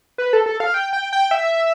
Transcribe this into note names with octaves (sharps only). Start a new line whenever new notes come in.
B4
A4
A4
F5
G5
G5
G5
E5